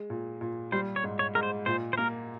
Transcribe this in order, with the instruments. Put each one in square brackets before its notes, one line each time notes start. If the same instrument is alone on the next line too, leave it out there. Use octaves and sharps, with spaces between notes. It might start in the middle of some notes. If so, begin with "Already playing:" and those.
Already playing: [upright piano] G#3
A#2
A#2
[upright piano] G3 [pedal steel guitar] C5
[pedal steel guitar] C#5
[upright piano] G#2
[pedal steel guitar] C#5
[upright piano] G#2 [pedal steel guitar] A#4
[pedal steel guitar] C5
[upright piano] A#2 [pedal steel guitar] C5
[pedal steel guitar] C5
[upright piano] A#3 [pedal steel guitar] A#4